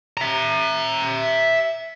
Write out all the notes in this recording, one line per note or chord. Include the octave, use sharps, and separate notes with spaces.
E5 A#5